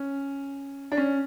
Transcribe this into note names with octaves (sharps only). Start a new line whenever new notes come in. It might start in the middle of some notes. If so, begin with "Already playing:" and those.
Already playing: C#4
D4
C#4